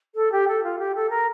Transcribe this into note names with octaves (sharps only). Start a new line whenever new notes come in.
A4
G4
A4
F4
G4
A4
A#4